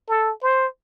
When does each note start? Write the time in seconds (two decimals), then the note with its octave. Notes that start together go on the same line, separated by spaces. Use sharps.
0.09 A4
0.43 C5